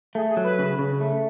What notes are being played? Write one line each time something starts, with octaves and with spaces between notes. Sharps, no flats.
A3 G#4
G#4
F#3
B4
C#3
C#3
A3